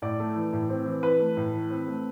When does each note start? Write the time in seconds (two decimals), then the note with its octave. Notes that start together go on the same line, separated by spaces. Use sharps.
0.02 A2 D5
0.20 A3
0.36 E3
0.53 A2
0.69 C4
0.86 E3
1.03 E3 B4
1.19 A3
1.37 A2
1.54 E3
1.70 C4
1.87 A3